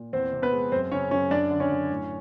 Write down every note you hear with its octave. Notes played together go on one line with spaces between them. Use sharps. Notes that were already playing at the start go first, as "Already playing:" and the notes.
Already playing: A#2
E2 C4 C5
C3
B3 B4
G#3
F#2 C4 C5
C#3 C#4 C#5
F#2 C#4 C#5
F#2 D4 D5
D3
C#4 C#5
F#2
A2